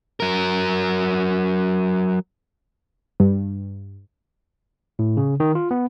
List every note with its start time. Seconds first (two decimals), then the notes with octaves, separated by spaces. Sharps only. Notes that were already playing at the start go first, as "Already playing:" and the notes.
0.20 F#3 A#4
3.20 G2
4.99 A2
5.17 C#3
5.40 D#3
5.55 F4
5.71 B3